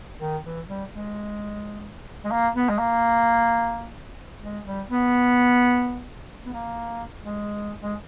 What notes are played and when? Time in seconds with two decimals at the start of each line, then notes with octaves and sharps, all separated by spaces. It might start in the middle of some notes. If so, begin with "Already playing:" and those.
0.21 D#3
0.44 E3
0.67 G3
0.91 G#3
2.24 G#3
2.32 A#3
2.55 B3
2.69 G#3
2.79 A#3
4.43 G#3
4.65 G3
4.89 B3
6.46 B3
6.53 A#3
7.24 G#3
7.83 G#3